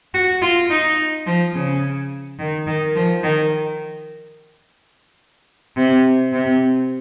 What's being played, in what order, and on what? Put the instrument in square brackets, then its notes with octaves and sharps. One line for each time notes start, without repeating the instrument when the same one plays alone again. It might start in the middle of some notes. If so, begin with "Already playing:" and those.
[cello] F#4
F4
D#4
F3
C#3
D#3
D#3
F3
D#3
C3
C3